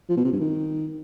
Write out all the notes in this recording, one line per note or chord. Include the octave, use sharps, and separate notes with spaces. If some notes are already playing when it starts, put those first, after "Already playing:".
F3
B2
C3
G2
D#3